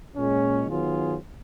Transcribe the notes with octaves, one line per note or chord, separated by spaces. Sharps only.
A#2 G#3 C#4
D#3 F#3 B3 F4 G#4